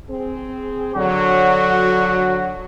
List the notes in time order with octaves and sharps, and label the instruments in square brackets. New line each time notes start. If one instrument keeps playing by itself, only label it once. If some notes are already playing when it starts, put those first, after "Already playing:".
[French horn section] C4 G#4
[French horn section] D3 F#3 [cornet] F#4